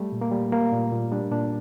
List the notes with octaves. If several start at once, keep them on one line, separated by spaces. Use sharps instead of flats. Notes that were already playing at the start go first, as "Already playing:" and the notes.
Already playing: G3 A3
A#2
A#3
G3
G3 A#3
A#2
A#2
G3 D4
A#2 D4